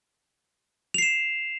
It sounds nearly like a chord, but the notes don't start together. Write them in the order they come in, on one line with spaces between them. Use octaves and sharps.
F7 C7 E7